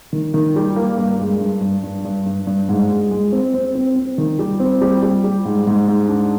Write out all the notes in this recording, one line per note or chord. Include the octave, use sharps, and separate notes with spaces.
D#3
D#3
G3
A#3
G2
G#3
G2
G2
G2
G2
G2
G2
G#2
G#3
G#3
C4
C4
C4
C4
D#3
G3
C4
G3
G3
G3
G#2
G#2
G#2
D4